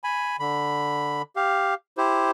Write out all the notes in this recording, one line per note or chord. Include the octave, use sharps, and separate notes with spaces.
G#5 B5
D3 B5
G4 F5
E4 G4 C5